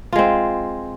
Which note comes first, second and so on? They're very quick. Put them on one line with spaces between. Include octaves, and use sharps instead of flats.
F4 G#3 C4